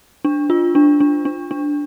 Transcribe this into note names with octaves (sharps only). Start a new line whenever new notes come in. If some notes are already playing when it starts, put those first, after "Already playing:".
D4
F4
D4
D4
D4
D4